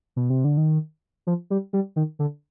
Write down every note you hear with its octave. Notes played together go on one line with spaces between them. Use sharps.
B2
C3
D3
D#3
F3
G3
G3
D#3
D3